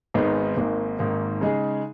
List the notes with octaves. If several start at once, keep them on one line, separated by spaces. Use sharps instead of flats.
G#1 G#2 D#3 G#3 B3
G#1 G#2 D#3 A#3
G#1 G#2 D#3 A#3
C#3 G#3 D#4 G#4